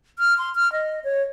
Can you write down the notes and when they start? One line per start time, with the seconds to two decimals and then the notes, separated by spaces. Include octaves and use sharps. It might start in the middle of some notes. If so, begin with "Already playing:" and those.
0.19 F6
0.38 C6
0.55 F6
0.72 D#5
1.04 C#5